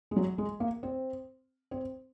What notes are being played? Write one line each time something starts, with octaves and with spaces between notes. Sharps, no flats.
G#3
F#3
G#3
A#3
C4
C4